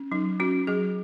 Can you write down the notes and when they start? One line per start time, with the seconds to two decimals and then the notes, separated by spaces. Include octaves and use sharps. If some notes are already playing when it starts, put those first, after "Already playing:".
Already playing: C#4
0.11 F#3 D#4
0.40 C#4 F#4
0.67 F#3 G#4